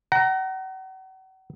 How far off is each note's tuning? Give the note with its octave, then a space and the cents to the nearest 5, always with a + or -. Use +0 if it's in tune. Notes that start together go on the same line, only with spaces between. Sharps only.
F#5 +40 A#5 +0